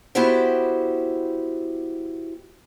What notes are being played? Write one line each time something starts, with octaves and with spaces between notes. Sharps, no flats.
B3 E4 F#4 G4 C5 G5